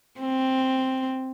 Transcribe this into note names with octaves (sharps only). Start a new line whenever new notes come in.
C4